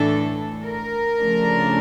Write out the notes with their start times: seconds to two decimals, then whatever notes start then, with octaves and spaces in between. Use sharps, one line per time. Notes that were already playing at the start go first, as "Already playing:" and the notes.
Already playing: A2 E3 A3 D4 A4
0.63 A#4
1.19 C#3 F3 A3 D4